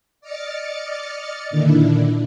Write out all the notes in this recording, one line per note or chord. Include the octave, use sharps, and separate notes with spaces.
D5 D#5 D6 F6 A6 C#7
A#2 D3 D#3 D4 E4